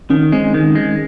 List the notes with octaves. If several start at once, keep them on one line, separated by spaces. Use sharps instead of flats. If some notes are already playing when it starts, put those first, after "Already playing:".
D#3 C#4
G#3 C4
D#3
G#3